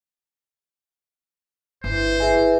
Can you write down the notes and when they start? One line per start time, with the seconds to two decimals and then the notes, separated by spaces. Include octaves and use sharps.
1.84 G1 E3 C5
2.20 E3 G#4 E5 G#5